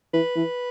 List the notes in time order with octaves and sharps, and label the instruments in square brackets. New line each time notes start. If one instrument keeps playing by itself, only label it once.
[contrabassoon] E3 [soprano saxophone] B4
[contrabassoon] E3